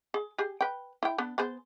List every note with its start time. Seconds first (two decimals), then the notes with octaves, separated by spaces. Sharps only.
0.14 G#4
0.38 G4 G#4
0.61 B4 G5
1.03 E4 G5
1.18 B3 D4
1.38 B3 G#4 C5